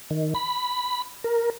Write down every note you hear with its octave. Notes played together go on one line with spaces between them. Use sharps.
D#3
B5
A#4